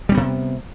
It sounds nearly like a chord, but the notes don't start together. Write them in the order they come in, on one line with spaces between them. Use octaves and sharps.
G3 C4 B3 C3